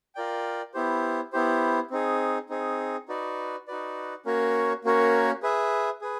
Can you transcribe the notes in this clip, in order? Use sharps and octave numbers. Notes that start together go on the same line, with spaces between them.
F4 A#4 D5 G5
B3 E4 G4 C5
B3 E4 G4 C5
C4 D#4 G#4
C4 D#4 G#4
D#4 F#4 B4 D5
D#4 F#4 B4 D5
A#3 C#4 F#4 A#4 C#5
A#3 C#4 F#4 A#4 C#5
G#4 B4 E5
G#4 B4